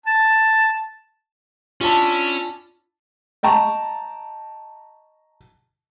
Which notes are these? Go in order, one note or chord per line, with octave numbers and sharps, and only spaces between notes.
A5
C#4 D4 E4 F4 A5
D#5 G5 A5 A#5 C#6